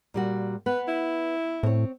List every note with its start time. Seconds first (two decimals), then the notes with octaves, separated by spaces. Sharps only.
0.14 A#2 G3 F#4
0.66 B3 B4
0.88 E4
1.63 A2 C4 C#5